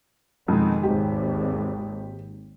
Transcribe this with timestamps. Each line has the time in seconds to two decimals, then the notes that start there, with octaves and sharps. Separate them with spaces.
0.48 F2 B2 D#3 G#3
0.83 G#1 D#2 G4